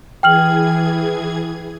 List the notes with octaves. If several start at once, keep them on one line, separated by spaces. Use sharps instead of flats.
E3 G#4 G5 F6 G#6 F#7